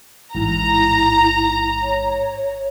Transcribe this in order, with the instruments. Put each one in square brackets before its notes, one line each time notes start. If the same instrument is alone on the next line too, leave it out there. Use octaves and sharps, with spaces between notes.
[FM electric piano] A1 G#2 [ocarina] E4 [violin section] A#5
[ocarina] C#5